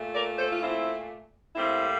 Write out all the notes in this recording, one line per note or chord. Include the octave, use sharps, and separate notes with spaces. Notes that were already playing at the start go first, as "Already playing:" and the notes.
Already playing: A#2 A3
A#4 D5
A4 C5
F4
C4 E4
A2 G3 A#3 C4 E4